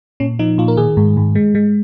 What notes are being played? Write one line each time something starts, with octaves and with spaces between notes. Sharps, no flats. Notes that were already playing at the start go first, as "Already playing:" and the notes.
A#2 C#4
F3 D#4
A#2 F4
A#4
D#3 G#4
G#2
G#2
G#3
G#3